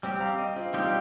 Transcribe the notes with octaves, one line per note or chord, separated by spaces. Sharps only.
G3 C4 G4
F5 A#5
D#5 G5
C4 F4
G3 C4 D#4 G4
F4